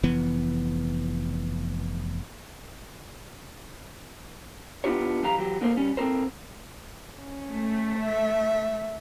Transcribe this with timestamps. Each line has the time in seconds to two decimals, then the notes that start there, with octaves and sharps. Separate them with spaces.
0.03 F1 E3 B3
4.84 B3 D4 E4 F4 G4 C#5
5.22 B1 F#2 E3 G4 F5 A#5
5.37 E3 F#3 G4
5.61 D3 A#3 A#4 C5
5.77 G3 C#4
5.97 C4 D4 A4 A#4 C5
7.20 C#4
7.50 A3
7.99 E5